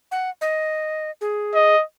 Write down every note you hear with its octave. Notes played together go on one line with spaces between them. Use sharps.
F#5
D#5
G#4
D#5